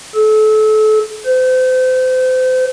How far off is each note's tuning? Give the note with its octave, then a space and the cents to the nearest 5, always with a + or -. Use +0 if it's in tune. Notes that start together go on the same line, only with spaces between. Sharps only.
A4 -30
C5 -35